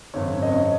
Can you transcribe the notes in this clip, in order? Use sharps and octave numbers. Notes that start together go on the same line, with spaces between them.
G#1 F#2 C#3 C#5
G#1 F#2 C#3 D#5
C#5
D#5